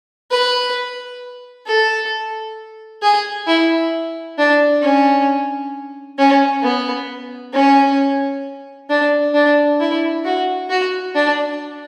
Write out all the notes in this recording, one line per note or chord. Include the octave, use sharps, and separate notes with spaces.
B4
A4
G#4
E4
D4
C#4
C#4
B3
C#4
D4
D4
E4
F#4
F#4
D4